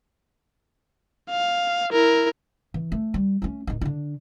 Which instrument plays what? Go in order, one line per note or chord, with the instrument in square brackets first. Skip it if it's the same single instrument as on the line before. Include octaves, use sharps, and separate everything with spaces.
[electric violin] F5
E4 A#4
[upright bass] E3
A3
G3
A3 C#4
D1 D#4
D3 D4